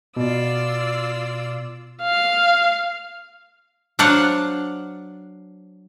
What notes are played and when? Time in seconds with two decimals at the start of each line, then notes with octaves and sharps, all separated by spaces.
0.17 B2 F4 D5 E6
2.02 F5
3.99 F#3 D4 C5 F5 F#5